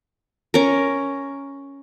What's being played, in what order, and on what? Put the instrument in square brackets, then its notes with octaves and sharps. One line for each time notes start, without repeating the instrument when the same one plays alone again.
[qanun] C#4 A#4